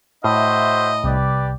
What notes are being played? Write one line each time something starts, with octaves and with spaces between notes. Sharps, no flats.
A2 F#4 C5 D#5 E5
C2 G4 B4 D5